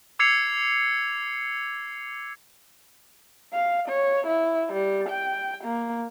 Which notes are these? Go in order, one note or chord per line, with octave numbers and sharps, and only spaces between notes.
D6 E6 G#6 C7 C#7 F7
F5
C#5
E4
G3
G5
A#3